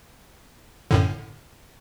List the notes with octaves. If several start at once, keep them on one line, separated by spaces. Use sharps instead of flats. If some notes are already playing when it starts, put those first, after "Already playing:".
F#2 A2 D3